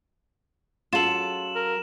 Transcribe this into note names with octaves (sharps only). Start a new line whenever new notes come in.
F#3 C#4 F4 G#4 A4 E7 F#7
A#4